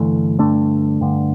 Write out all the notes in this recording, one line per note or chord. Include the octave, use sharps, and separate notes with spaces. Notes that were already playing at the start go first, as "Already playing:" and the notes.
Already playing: G2 D3 E3 A3
G2 D3 A3 D4
G2 D3